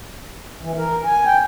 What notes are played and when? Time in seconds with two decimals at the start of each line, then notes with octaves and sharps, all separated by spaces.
0.62 E3
0.78 A#4
1.04 G#5
1.26 G5